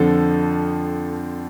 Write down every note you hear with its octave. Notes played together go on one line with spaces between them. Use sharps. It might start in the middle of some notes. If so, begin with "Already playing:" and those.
Already playing: F2 D3 F3 A4